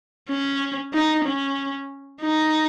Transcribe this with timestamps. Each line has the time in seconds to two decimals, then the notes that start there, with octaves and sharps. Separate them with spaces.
0.29 C#4
0.93 D#4
1.25 C#4
2.21 D#4